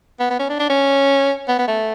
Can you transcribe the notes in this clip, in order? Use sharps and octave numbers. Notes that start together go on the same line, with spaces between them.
B3
B3
C#4
D4
D4
C#4
B3
B3
A3